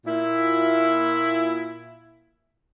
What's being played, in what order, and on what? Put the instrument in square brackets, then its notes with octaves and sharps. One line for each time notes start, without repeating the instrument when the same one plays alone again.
[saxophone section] A#2 E4